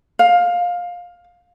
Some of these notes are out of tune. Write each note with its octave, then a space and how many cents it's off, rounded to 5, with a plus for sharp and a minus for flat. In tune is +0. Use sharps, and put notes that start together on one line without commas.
F5 +15